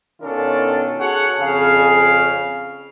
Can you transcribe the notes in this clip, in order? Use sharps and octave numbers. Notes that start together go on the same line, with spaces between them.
B2 D#3 C#4 D4 F4 A4
F#4 G#4 A4 C#5 F#5
F2 C#3 G#4 F5